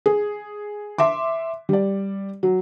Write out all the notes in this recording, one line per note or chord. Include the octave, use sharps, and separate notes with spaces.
G#4
E5 C6 D6
G3 D5
F#3